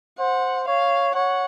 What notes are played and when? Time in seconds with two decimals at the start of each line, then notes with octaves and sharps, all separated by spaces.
0.19 C5 F#5
0.68 C#5 F5
1.15 C#5 F#5